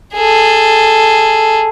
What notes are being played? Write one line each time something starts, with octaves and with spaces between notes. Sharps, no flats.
G#4 A4